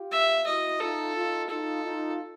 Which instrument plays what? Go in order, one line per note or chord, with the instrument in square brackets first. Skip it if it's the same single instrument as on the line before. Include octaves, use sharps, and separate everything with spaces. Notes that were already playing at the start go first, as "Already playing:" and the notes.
Already playing: [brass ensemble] F4 G4
[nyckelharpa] E5
[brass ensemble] E4 F#4 [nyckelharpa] D#5
[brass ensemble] D#4 F4 [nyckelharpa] A4
[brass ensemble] D#4 F4
[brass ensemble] D#4 F4 [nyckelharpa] A4
[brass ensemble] D#4 F4